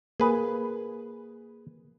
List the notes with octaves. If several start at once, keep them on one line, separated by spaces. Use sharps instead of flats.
A#3 G#4 B4